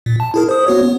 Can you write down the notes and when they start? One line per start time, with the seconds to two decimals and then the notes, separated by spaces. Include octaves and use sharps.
0.06 A#2
0.20 A5
0.34 E4 G#4 A#4
0.49 C5 D#6
0.67 B3 F#4 C#5
0.82 B3